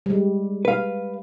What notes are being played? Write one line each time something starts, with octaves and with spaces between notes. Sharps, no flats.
G3 G#3
B4 F5